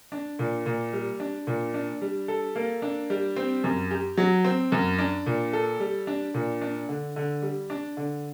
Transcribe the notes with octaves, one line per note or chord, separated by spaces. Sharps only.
D4
A#2
A#2
G3
D4
A#2
D4
G3
A4
A#3
D4
G3
C4
F#2
G4
F#3
C4
F#2
D4
A#2
A4
G3
D4
A#2
D4
D3
D3
G3
D4
D3